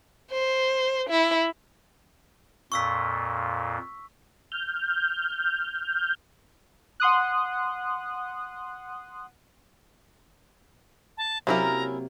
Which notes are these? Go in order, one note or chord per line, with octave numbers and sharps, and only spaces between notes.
C5
E4
F2 A#2 C#6 E6 B6
F6 G6
F#5 C6 D#6 F#6
A5
C3 F#3 A#3 C#4 E4 A#4 A#5